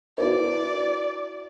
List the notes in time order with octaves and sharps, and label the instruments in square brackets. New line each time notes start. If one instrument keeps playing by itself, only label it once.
[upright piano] E4 F#4 B4 [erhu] D5